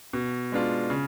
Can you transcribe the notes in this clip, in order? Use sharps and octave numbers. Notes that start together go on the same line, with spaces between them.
B2
G#3 B3 D4 F4
C#3